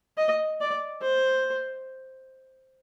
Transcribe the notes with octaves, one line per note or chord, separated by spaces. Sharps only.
D#5
D5
C5